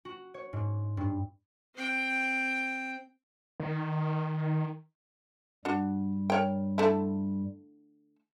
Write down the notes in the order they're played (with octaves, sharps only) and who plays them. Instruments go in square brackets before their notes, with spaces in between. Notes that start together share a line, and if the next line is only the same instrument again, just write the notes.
[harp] F#4
C#5
G#2
G2
[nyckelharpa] C4 G5
[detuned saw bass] D#3
[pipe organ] G2 G3 [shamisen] D4 F#4
[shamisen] A#4 C#5 G5
D3 A3 E4